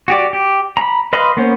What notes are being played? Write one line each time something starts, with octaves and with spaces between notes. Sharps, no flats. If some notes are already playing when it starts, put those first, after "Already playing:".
F#4 G4 D5
G4
A#5 B5
B4 D#5 F5 B5 C6
A#3 B3 C#4 C5